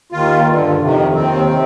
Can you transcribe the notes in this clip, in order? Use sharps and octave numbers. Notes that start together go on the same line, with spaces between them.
D#2 D#3 F4
G2 D3
F2 C3 D#3
D#2 D#3 C4
C3